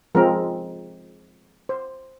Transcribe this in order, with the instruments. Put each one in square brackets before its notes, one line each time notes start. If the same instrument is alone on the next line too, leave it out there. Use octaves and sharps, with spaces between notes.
[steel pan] F3 G#3 C4 A#4
C5